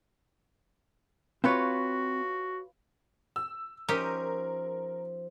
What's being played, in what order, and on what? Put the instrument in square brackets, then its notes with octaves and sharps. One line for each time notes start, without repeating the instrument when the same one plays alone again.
[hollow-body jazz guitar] C4 F5 [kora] F4 B4 C#5 [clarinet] F#4
[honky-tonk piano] E6
[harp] F3 [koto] C#4 D#4 G4 [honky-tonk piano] A#4